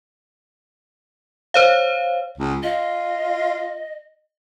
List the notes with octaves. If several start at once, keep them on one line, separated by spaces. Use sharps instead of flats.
C5 C#5 F5
C#2
F4 D#5